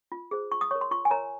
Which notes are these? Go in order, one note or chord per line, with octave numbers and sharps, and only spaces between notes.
F4
G#4 C5
F4 C#6
D#6
A#4 C#5 C#6
C6
F4 C#6
G#5
A#4 C#5 A#5